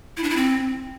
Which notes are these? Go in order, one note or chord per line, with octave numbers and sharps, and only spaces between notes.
E4
D4
E4
C4